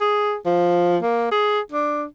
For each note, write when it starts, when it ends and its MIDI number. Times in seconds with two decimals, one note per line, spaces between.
0.01 0.36 68
0.46 0.97 53
1.02 1.27 58
1.31 1.60 68
1.72 2.05 62